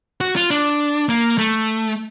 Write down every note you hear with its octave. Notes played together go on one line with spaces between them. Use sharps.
F#4
F4
D4
A#3
A3